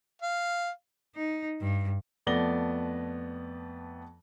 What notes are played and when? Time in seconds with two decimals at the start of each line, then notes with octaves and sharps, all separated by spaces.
0.21 F5
1.15 D#4
1.61 G2
2.27 F2 A3 B3 D5 A#6 G7